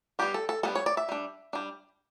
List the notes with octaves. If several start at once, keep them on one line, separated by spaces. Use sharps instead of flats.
G3 B3 D4 G4
A4
A4
G3 B3 D4 A4
C#5
D5
E5
G3 D4
G3 D4